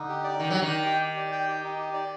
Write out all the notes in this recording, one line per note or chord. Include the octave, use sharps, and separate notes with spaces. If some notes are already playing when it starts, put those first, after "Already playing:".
Already playing: D3 D#4
G4
D5
D#3 G4
F#3 D5
D#3
G5
G4
G4
D5
G5
G4
D#4
G4
D5